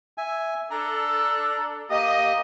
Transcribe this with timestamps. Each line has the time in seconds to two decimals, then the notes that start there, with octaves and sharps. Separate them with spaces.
0.18 E5 G#5
0.71 D4 A4 A#5
1.90 A#3 G4 D#5